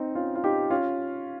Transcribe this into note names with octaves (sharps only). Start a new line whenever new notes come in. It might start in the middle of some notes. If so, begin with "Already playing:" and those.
Already playing: C4 D#4
C#4 F4
F4
D#4 G4
C#4 F4